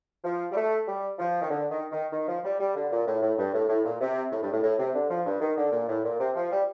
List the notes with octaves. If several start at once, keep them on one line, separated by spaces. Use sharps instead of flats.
F3
G3
A3
G3
F3
D#3
D3
D#3
D#3
D#3
F3
G3
G3
D3
A#2
A2
A2
G2
A2
A2
A#2
C3
A2
G2
A2
A2
C3
D3
F3
G2
D#3
D3
A#2
A2
A#2
C3
F3
G3